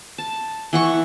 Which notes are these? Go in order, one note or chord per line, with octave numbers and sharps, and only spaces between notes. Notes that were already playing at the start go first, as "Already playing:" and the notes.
A5
E3 F#5 C#6